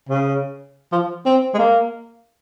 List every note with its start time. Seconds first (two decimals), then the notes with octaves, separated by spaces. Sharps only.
0.09 C#3
0.92 F3
1.26 C4
1.54 G#3
1.58 A#3